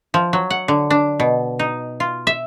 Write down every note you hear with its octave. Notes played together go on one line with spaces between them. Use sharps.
F3
F#3
F#5
D3
D4
B2
D#4
F4
E5